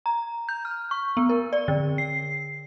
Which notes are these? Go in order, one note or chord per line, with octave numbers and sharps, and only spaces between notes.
A#5
G6
F6
C#6
B3
A#4
D5
D3
C7